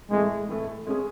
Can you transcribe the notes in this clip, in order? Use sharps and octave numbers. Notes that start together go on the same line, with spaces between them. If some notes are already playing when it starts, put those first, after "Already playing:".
A2 E3 G#3 A3
A2 E3 A3
G#3 C#4 G#4